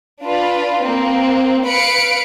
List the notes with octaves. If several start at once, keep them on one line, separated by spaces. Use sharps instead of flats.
D4 F4 B4
A#3 C4
B4 F5 B5 C#7 D7